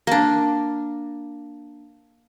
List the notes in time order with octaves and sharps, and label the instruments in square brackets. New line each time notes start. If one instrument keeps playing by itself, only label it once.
[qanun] A#3 D4